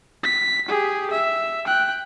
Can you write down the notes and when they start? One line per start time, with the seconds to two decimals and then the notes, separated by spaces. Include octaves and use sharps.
0.23 B6
0.69 G4 G#4
1.11 E5
1.66 G5 F#6